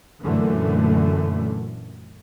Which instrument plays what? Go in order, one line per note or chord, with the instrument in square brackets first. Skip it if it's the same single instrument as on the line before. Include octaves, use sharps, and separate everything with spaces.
[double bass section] F#2 A#2 D3 E3 A3